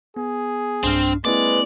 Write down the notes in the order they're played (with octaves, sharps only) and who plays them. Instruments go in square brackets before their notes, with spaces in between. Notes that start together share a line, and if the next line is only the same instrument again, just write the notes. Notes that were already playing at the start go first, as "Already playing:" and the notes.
[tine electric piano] B3 [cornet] G#4
[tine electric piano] B1 G2 F6 [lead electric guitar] C4 [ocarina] D4
[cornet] G#3 [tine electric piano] A#3 C4 E4 [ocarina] B4 [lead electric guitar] D5